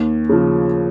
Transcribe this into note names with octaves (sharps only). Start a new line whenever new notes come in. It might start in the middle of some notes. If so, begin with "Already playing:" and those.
Already playing: D#2
C#3 F3